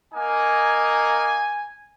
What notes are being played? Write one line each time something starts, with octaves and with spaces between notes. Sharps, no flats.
A#3 D#4 G#5